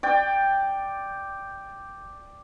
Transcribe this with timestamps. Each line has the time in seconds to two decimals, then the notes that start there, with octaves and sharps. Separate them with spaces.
0.03 D5 G5